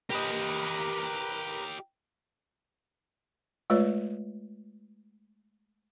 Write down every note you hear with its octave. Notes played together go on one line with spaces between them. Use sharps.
G4 A#4 B4 D#5
G#3 A3 F4 B4 C#5 D5